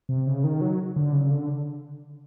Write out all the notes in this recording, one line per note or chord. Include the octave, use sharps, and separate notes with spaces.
C3
C#3
D#3
F#3
D3
C#3
D3